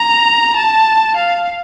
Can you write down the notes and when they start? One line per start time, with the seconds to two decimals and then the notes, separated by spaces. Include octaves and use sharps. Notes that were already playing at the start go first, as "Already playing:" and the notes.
Already playing: A#5
0.56 A5
1.17 F5